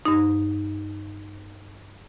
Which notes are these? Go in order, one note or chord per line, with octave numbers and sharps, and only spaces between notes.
G2 D#4